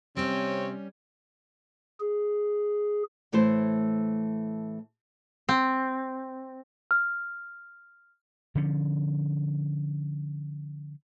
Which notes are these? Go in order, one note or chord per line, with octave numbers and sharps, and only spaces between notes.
C3 G3 C4 C#4 C#5
G#4
A2 E3 A3 E4 C5
C4
F6
D3 F3 C#4